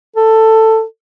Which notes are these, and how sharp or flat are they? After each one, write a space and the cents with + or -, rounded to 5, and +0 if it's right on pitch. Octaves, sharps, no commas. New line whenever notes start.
A4 +10